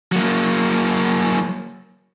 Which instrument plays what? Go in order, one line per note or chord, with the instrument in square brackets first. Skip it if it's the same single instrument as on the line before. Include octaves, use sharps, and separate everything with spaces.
[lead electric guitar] F#3 A#3